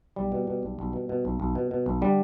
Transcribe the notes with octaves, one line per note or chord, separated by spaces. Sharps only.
B1 G3
B2
B2
B1
B1
B2
B2
B1
B1
B2
B2
B1
D3 G3